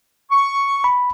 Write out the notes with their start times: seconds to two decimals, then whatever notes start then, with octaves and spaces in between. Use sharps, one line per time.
0.31 C#6
0.84 B5